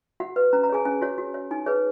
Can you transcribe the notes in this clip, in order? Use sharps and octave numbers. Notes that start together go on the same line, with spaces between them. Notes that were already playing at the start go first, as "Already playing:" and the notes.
F#4 F#5
B4
C#4 A#5
A#5
G#4 C#5 G#5
C#4 G#5
F#4 C#5
F#4
C#5
D#4 G#5
G#4 B4 C#5